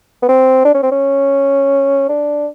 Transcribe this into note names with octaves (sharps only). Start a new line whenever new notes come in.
B3
C4
D4
C#4
C4
C#4
D4